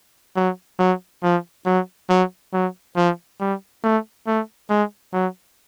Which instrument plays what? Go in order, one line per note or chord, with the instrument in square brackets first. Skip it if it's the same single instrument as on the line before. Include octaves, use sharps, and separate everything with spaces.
[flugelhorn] F#3
F#3
F3
F#3
F#3
F#3
F3
G3
A3
A3
G#3
F#3